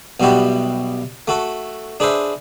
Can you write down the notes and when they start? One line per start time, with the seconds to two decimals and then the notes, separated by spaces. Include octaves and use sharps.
0.20 B1 B2 G3 E4 F#4 G4
1.28 A3 F#4 A4
2.00 D4 G#4 B4 C5 E5